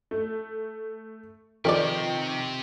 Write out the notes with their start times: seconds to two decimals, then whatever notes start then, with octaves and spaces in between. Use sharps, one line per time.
0.11 A3
1.65 C3 D#3 F3 G4 B4 C#5 D5